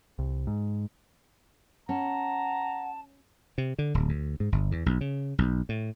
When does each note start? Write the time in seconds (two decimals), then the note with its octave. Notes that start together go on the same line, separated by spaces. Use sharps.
0.19 C2
0.47 G#2
1.89 C#4 F#5 A5 A#5
3.58 C3
3.79 D3
3.94 D1
4.09 D2
4.40 G#2
4.52 G1
4.72 E2
4.86 B1
5.01 C#3
5.38 B1
5.69 A2